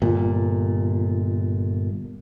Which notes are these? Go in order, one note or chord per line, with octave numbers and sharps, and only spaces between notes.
G1 A#2